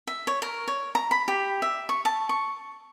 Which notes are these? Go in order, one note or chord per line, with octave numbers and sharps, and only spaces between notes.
E5
C#5
A#4
C#5
A#5
B5
G4
E5
C#6
A5
C#6